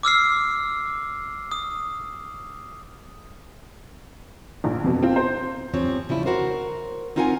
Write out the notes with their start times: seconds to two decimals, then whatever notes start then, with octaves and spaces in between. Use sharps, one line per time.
0.03 D6 E6 F6 C7
1.51 D#6
4.64 A#1
4.84 F2 B2
5.02 C4 F4
5.16 C5
5.73 E2 G2 F3 C4 C#5
6.09 C#3 F3 G3 E4
6.26 F#4 A#4 C5
7.16 C4 D#4 F4 A#4 F#5 G#5